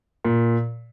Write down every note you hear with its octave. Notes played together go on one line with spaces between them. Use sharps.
A#2